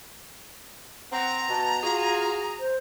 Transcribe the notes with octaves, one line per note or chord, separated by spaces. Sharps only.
C4 F#5 A#5
B2 A5
F4 F#4 G#4
C5